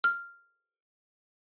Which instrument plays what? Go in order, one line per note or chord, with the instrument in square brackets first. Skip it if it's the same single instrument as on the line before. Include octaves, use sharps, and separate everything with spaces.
[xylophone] F6